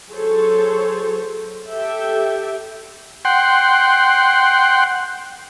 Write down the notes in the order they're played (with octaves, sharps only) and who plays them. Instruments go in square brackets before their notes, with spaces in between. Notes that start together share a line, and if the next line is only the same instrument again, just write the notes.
[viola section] F#3 G#4 A4 C5 C#5
G4 A4 E5 G5
[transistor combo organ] F#5 G5 C6